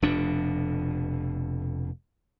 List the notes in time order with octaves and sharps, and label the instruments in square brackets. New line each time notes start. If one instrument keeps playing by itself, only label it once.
[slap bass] F1 F2 B2 D4